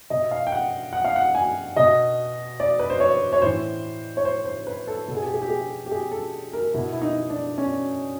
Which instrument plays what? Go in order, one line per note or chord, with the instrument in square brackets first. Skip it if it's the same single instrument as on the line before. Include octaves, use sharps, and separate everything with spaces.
[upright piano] B2 D#5
F5
G5
F#5
F#5
F5
F#5
G#5
B2 D#5
D5
B4
C5
C#5
C#5
A2 E3 C5
C#5
C5
C5
B4
A4
B2 A4
G#4
G4
G#4
G4
G#4
G4
G#4
A4
A#4
B2 E4
E4
D#4
D4
C#4